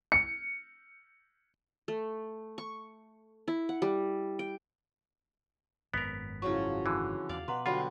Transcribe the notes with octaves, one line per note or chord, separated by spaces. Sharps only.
C#7
A3
C#6
E4
F#5
G3
G5
G#1 F#2 B3 A#4 B6
C#3 F3 F#3 E4 C#5 C#6
D3 E3
E2 D5 F5
B2 B4 F#5 A#5 C6
D3 F#3 G3 F4 F#5 B5 C6